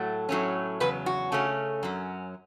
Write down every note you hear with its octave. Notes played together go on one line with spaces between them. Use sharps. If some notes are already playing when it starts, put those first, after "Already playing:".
Already playing: A2 F#3 A3
A2 F#3 A3 C#4
E2 C#3 F#3 B4
F#4
C#3 A3 C#4
F#2 F#3 C#4